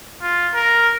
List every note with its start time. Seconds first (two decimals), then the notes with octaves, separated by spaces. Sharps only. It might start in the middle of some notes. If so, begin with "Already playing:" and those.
0.22 F4
0.54 A#4